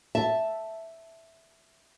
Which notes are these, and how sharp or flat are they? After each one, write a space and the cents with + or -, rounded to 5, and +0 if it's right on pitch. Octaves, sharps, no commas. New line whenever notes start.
E5 +0 A5 +0